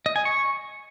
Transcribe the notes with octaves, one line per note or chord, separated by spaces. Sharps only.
D#5
G#5
C#6